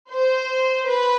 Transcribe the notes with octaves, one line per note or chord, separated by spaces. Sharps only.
C5
B4